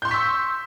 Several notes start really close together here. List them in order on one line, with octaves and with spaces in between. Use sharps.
G6 C6 C#6 B6 E6